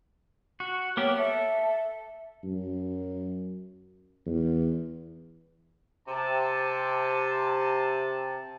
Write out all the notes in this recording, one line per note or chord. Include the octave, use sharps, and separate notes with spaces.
F#4
A#3 B3 G4 C#5
A4 E5
F#2
E2
C3 A5